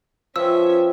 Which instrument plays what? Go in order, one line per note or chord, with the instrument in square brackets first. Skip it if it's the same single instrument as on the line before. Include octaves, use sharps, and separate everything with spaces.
[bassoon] F3 [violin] C#4 E5 [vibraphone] F4 B4 G5 [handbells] E6